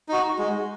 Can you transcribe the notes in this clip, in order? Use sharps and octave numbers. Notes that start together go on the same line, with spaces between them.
D#4 F#4
G#3